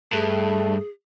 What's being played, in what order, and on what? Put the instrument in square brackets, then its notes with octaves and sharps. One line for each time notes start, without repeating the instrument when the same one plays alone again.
[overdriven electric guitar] G2 [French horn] A3 [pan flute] G#4